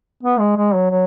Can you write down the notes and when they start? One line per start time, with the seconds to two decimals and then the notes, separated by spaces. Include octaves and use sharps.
0.23 B3
0.39 G#3
0.57 G#3
0.75 F#3
0.91 F#3